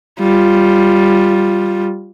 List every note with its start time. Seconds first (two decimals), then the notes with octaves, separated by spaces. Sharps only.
0.19 G3 F4